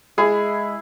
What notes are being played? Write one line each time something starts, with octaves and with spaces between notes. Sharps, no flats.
G#3 E4 G#4